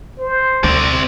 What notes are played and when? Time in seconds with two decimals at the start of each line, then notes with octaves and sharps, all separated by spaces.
0.19 C5
0.64 D2 C4 D5